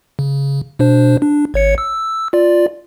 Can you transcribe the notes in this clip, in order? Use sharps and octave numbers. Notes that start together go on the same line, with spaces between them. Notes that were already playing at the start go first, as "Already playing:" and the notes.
C#3
B2 D4 C5
D4
G#1 C#5 C#7
E6
F4 D5